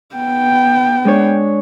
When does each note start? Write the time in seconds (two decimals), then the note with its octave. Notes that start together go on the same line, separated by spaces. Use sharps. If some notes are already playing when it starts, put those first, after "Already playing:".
0.15 B3 G5
1.05 G#3 D4 C#5